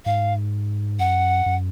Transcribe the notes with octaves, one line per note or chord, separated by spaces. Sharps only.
G#2 F5
F#2 F#5
F#2